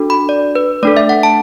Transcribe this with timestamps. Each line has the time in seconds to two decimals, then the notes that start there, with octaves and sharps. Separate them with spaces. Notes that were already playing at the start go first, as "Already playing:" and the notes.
Already playing: D4 F#4 A4
0.10 B5
0.29 D5
0.55 B4
0.83 A3 D4 A4 D5
0.97 E5
1.09 F#5
1.23 A5